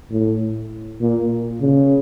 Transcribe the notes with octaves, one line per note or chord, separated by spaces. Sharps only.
A2
A#2
C#3